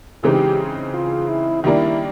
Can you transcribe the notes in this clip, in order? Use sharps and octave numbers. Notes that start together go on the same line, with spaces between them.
C#3 E3 G#3 C4 D#4 G4
F4
E4
D#3 G3 A#3 D4 E4